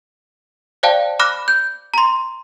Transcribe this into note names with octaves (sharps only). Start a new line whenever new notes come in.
C5 D5 F5 G5 A5
B5 D6 F6 F#6 A#6
G6
A#5 C6